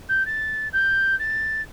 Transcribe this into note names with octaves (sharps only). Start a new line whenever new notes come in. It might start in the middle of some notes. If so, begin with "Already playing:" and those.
G6
A6
G6
A6